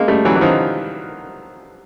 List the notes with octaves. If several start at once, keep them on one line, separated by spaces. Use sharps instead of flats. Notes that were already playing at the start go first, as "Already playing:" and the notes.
Already playing: G#3 A#3
G3 A3
E3 F#3
E3
D#3 F3